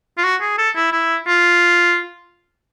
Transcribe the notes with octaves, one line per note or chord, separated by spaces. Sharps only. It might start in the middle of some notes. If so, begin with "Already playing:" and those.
F4
F#4
G#4
A4
E4
E4
F4